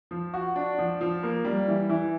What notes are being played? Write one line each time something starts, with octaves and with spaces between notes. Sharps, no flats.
F3
F#4
D4
F3
F3
A#3
G3
E3
E3